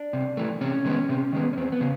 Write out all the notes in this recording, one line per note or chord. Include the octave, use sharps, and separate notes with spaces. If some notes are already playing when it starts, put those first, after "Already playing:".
Already playing: D4
C3
E3 A3
C3 C#4
D#3 G#3 B3
C3
D#3 G#3 B3
C#4
E2 C4
B3
C#3